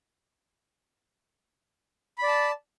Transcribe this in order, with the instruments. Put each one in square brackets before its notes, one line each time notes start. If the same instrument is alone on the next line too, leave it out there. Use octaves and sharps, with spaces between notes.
[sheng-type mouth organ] B5
D5
A5